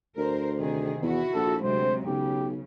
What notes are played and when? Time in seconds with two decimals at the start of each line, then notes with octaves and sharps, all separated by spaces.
0.17 D2 A#4 C5
0.58 C3 D#3 G#4
1.02 E2 E4 F#4
1.34 A#1 A4
1.63 D2 C3 F#3 G#3 C5
2.06 B1 C#3 G4